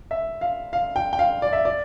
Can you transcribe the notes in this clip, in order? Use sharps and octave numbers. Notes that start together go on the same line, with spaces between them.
E5
F5
F5
G5
G5
F5
D5
E5
D5